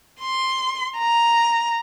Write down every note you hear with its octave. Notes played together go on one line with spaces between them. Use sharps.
C6
A#5